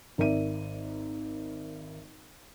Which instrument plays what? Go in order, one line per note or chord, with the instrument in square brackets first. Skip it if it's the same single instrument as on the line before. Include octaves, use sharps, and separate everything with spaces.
[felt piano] G#1 A#4 D5 E5 D#7